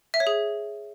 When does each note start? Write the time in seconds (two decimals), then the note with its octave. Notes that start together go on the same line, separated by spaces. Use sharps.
0.14 E5
0.20 C#5
0.27 G#4